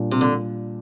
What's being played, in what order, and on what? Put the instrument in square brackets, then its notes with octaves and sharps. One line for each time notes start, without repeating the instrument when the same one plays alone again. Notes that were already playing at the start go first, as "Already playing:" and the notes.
Already playing: [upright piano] A#2 G3 D4
[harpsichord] C3
D3